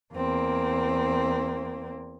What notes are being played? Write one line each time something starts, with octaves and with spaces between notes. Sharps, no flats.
E2 A#3 C4